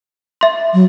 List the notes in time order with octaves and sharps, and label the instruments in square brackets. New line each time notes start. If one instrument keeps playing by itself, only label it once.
[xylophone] E5 C6
[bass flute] F#3